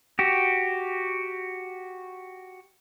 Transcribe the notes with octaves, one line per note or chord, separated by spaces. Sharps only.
F#4 G4